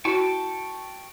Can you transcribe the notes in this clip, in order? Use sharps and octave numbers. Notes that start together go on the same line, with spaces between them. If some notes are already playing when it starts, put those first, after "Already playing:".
E4 F#4 G5 A5 C#6